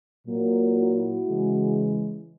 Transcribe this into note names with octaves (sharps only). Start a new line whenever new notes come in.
A#2 F#3 A#3
E4 F#4
C#3 E3 G#3